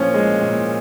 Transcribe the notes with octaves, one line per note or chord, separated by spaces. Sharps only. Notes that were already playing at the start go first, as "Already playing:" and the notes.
Already playing: A#2 F3 C#4
G#3
A#2